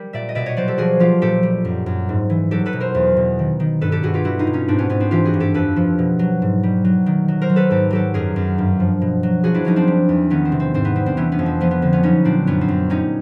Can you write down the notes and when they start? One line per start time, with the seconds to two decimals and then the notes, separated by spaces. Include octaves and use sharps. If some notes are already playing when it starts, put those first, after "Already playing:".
Already playing: G3 A#4
0.13 A#2 D5 E5
0.29 D#5
0.35 B2 D5 E5
0.46 C#5 D#5
0.56 F#3 C5 D5
0.68 G4 A4
0.78 F3 F#4 G#4
1.00 F3 F4 G4
1.22 A#2 G4 A4
1.43 G3
1.65 F#2
1.86 F#2
2.09 G#2
2.30 E3
2.51 F#3 G4 A4
2.66 A4 B4
2.73 B2
2.80 A#4 C5
2.95 E2
3.17 B2
3.39 D#3
3.60 D#3
3.81 G2 A4 B4
3.92 G4 A4
4.03 G2 F#4 G#4
4.14 F4 G4
4.24 G3 E4 F#4
4.39 D#4 F4
4.47 B2
4.53 C#4 D#4
4.68 G#2 C4 D4
4.79 B3 C#4
4.90 G#2 B3 C#4
5.00 C4 D4
5.11 E3 F4 G4
5.25 F#4 G#4
5.34 G2
5.40 G4 A4
5.54 F2 A4 B4
5.76 F3
5.99 B2
6.19 F#3
6.42 G#2
6.63 G3
6.84 F#3
7.06 D#3
7.28 F#3
7.42 A#4 C5
7.50 F#3
7.56 A4 B4
7.70 G#2 G4 A4
7.90 F#3 G4 A4
8.14 F#2 G#4 A#4
8.36 F#2
8.58 G2
8.80 F3
9.02 B2
9.23 F#3
9.44 F3 F#4 G#4
9.54 D4 E4
9.65 F3 C#4 D#4
9.76 C4 D4
9.87 G3
10.09 E2
10.30 D#3 B3 C#4
10.45 C4
10.52 C3
10.60 C4
10.74 G#2 C4
10.85 B3
10.96 G3 C4
11.06 C4 D4
11.17 E3 B3 C#4
11.32 B3 C#4
11.39 F2
11.46 C4
11.60 F3 B3
11.71 B3
11.82 D3 C4
11.93 B3 C#4
12.03 F#3 C#4 D#4
12.25 A#2 C4 D4
12.47 F#2 B3 C#4
12.61 C4
12.68 F#2
12.90 G3 C#4 D#4